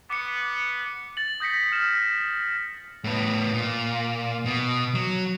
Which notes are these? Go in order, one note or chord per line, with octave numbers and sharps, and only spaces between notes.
B3 D6 C#7
A6 F#7
D#6 G6 A#6 B6 C#7
F6 E7
A2 B3
A#2
B2
F#3